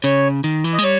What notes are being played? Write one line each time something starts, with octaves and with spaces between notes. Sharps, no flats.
C#3 C#5
D#3
E3
D#5
G#3
G3 C#5